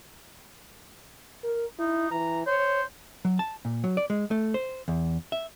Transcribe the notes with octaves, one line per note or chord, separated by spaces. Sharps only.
A#4
D#4 E4
E3 A#5
C5 C#5
F#3
A5
A#2
F#3
D5
G#3
A3
C5
E2
E5